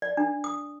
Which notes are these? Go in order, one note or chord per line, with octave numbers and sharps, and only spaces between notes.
D5
D4
D#6